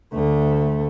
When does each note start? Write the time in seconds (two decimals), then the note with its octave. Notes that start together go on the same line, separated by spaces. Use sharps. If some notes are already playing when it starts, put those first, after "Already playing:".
0.14 D2 A3